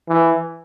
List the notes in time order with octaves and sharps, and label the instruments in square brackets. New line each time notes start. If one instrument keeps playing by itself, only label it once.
[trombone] E3